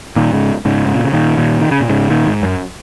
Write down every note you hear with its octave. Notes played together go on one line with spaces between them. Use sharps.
A#2 D#3
G#2 C#3
G#2 C#3
G#2
A#2
C#3
A#2 D#3
A#2 D#3
D#3
C#3
A#2
G#2 C#3
A#2 D#3
G#2
F#2